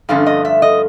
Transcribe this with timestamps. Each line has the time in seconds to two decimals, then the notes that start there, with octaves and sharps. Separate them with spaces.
0.09 G2 D3 F3 A3 C#4 F5
0.26 D#5
0.45 E5
0.62 D#5